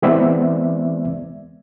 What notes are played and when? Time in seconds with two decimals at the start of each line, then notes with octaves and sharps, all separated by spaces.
0.02 E3 G#3 B3 C4 D5 E5